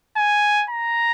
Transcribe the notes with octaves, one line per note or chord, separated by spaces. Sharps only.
G#5
A#5